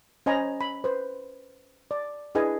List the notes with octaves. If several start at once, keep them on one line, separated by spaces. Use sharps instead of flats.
C#4 C5 D#5 G#5 A#5 B5
B5
B4 C5
D5
D4 E4 G#4 B4 D#5 G#5